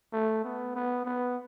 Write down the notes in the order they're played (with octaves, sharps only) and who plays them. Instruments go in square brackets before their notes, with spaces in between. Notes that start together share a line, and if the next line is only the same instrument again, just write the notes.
[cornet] A3
B3
B3
B3